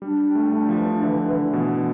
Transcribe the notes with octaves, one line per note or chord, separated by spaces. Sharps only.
G3 D4
G3
A3
A3 D4
F3
E3
D3 E3
D3 E3
B2 E3